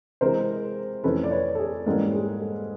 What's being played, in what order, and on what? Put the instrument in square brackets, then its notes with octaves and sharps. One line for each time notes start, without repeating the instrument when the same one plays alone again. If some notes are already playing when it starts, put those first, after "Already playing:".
[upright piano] C3 E3 G#3 A#4 C5
F2 C3 E3 A3 C#4 A4 B4
D5
B4 C#5
A4
G#4
G#2 E3 G3 A#3 C#4 A4
G#4
A4